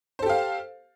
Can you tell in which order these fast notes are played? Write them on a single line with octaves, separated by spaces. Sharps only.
C5 A4 G4 F5